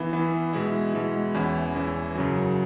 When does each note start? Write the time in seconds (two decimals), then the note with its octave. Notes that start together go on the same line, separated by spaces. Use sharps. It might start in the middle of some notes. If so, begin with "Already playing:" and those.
Already playing: E3 B3 E4
0.13 E3 B3 E4
0.53 B2 G#3 E4
0.94 B2 G#3 E4
1.34 E2 E3 C#4 E4
1.75 E2 E3 C#4 E4
2.15 F#2 C#3 F#3